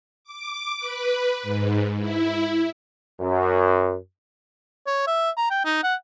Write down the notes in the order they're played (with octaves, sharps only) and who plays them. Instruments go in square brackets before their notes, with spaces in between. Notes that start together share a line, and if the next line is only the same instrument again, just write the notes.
[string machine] D6
B4
G#2
E4
[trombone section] F#2
[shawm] C#5
E5
A#5
G5
D#4
F#5